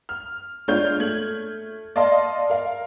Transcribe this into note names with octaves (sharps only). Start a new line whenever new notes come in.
F6
G#3 D4 F4 C#5 F6 G6
A3 G#6 F#7
D5 D#5 F5 A5 C6
A#4 F5